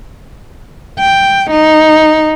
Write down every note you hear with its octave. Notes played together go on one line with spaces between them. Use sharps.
G5
D#4